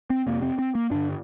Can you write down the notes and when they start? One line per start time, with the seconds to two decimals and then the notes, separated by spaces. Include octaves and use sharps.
0.10 C4
0.26 F2 C3 A#3
0.42 C4
0.59 C4
0.75 A#3
0.91 G2 D3 D4